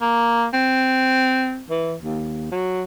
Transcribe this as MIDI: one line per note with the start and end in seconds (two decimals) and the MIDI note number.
0.02 0.46 58
0.53 1.63 60
1.70 1.96 52
2.02 2.50 39
2.52 2.84 54